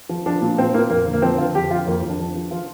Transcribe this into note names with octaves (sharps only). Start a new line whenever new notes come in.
F3
F3 D4
A#2
A#2 C4
A#2 A#3
F2 A#3
D3
A#3
F3 C4
D3 F4
F2 G4
F2 F4
F2 A#3
F2
D4
F3
F3
F3 F4